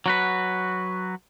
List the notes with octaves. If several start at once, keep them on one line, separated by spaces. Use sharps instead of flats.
F#3 F#4 B4